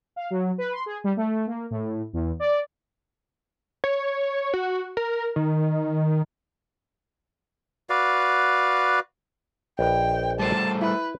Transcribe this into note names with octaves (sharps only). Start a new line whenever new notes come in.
F5
F#3
B4
C6
G#4
G3
A3
A#3
A2
E2
D5
C#5
F#4
A#4
D#3
F#4 B4 D5 F5
A#1 B4 D#5 G5
G3 A3 C5 A5
E4 B4